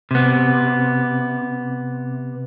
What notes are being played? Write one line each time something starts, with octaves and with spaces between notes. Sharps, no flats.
C3 B3